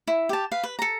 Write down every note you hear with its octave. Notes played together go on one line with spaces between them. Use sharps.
E4
G4 A5
B4 F5
B4
A4 A#5